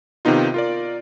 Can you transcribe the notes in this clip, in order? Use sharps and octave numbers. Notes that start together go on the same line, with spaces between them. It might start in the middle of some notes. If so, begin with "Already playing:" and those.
C3 D#3 B3 D#4 F4
F4 A#4 D5